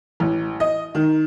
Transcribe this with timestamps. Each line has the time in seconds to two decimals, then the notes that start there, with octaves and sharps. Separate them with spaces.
0.20 A1
0.60 D#5
0.95 D#3